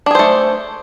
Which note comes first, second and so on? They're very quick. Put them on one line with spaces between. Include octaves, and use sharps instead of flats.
D4 G#4 C5 A3